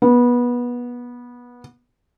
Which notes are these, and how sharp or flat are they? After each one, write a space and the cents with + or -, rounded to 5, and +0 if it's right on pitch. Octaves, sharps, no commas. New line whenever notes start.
B3 -20